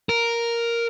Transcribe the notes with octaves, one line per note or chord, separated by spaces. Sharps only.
A#4